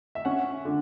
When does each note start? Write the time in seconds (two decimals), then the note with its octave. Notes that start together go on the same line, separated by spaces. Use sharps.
0.15 E5
0.25 C#4 F#5
0.65 D3